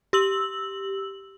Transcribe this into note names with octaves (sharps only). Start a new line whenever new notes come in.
G4 E6 F#7